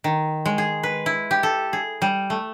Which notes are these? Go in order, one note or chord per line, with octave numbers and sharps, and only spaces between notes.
D#3
G#3
G#4
B4
E4
G4
A4
G#4
G3
A3